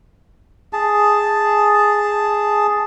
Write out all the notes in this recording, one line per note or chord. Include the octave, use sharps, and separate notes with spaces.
G#4 A5